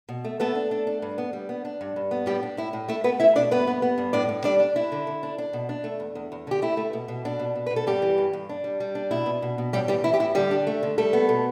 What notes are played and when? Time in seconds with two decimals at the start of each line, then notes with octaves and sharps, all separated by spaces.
0.09 B2
0.25 A3
0.40 A3 B3 A4
0.55 D4
0.71 D4
0.87 D4
1.02 G2
1.18 B3
1.33 G3
1.49 B3
1.65 D4
1.81 G2
1.96 G2
2.11 B3
2.26 A2 G3 G4
2.43 D4
2.57 A2 E4
2.73 A2
2.88 A3 E4
3.04 A3 B3 B4
3.20 A3 E4 E5
3.36 B2 D4 D5
3.51 G2 B3 B4
3.67 B3
3.82 B3
3.98 G2
4.13 A2 D4 D5
4.29 A2
4.44 G3 D4 D5
4.60 D4
4.76 D4 E4
4.92 D3
5.07 D3
5.23 D4
5.38 D4
5.53 B2
5.69 D4
5.84 A3
6.00 E2
6.15 E2
6.32 E2
6.47 D3 G4
6.62 A3 E4
6.77 A3
6.93 B2
7.08 B2
7.25 B2 D4
7.39 B2
7.55 B2
7.66 B2 B4
7.76 A4
7.87 G2 G3 G4
8.02 E3
8.18 G2
8.33 G2
8.49 D4
8.64 G3
8.80 G3
8.95 D4
9.11 B2 E4
9.26 B2
9.42 B2
9.58 B2
9.73 A2 G3 G4
9.88 E3 G3 G4
10.04 E3 E4
10.14 G4
10.20 A2 E4
10.35 D3 G3 G4
10.51 D4
10.67 A3
10.83 D3
10.98 G3 A3 A4
11.13 B3
11.29 B2